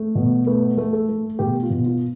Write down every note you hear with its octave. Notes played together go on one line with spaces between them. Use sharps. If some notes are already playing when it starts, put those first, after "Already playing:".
Already playing: A3
B2
A3 B4
A3
A4
A3
B2 G4
F4
B2
F4